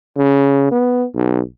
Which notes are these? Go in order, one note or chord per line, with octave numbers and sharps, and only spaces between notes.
C#3
B3
B1